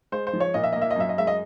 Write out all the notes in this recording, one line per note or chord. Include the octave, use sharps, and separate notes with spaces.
G#3 C5
C5
F3
C#5
A#2 D#5
E5
A#3 D#5
E5
D#5
F#2 E5
D#5
G#3 E5
D#5